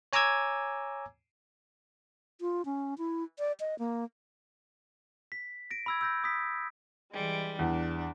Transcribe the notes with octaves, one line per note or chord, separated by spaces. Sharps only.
C#5 G#5 A#5 D6 E6 G#6
F4
C#4
E4
D5
D#5
A#3
B6
A#6 D7
B5 E6 G#6
E6 G6 A#6
D#6 B6
E3 G3 G#3
E2 D4